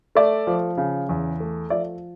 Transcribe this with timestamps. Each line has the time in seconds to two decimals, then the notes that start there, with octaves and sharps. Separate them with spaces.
0.15 A3 D5 E5
0.47 F3
0.77 C#3
1.09 E2
1.40 A3
1.70 F3 D5 E5